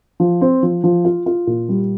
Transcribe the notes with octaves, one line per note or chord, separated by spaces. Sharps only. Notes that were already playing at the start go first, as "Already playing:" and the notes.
F3
C4
F3
F3
F4
F4
A#2
G3